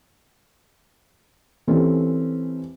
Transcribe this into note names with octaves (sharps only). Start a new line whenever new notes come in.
E3 C4 C#4 G4 A4